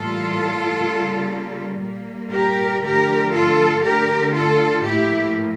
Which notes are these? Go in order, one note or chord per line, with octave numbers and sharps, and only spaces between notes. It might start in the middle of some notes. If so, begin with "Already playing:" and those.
Already playing: A2 E3 G3 A#3 F4 A4
C#3 G3 A#3
A#2 G3 A#3
G4 A#4
D3 F3 A3 G4 A#4
F4 A4
D3 A3 G4 A#4
F4 A4
A2 F3 A#3 E4 G4